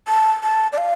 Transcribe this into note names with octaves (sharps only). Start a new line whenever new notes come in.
A5
A5
D5
F5